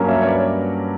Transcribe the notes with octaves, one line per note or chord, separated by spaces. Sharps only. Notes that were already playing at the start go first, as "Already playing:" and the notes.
Already playing: G2 F#3 A#3 C#4
C#5 E5
C#5
B4 D5